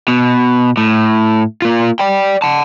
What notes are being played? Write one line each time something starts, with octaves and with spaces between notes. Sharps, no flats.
B2
A2
A#3 F4
D5 G5
F#5 A5